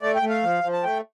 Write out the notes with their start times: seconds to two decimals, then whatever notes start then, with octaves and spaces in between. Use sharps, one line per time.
0.02 A3 D5
0.15 G5
0.22 A3
0.29 F5
0.43 F3
0.63 F3
0.73 A5
0.84 A3 G5